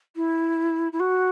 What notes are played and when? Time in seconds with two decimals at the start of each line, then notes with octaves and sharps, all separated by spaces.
0.16 E4
0.92 E4
1.00 F#4